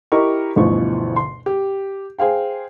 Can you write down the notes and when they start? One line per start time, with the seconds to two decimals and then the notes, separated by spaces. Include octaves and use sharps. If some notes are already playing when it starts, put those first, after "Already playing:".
0.12 E4 G4 A#4 D#5 C#6
0.56 G1 D2 B2 E3 F3 C#6
1.16 C6
1.46 G4
2.19 G#4 C5 F5 G5